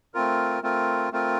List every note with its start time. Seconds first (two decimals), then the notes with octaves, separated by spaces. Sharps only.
0.14 A3 C4 F4 A#4
0.62 A3 C4 F4 A#4
1.12 A3 C4 F4 A#4